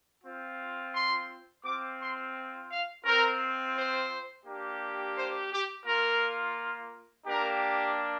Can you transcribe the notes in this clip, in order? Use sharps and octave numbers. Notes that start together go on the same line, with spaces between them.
C4 F4
C6
C4 F4 D6
C6
F5
C4 F4 A#4
C5
A#3 D4 G4
C5
G4
A#3 F4 A#4
A#3 D4 G4 A#4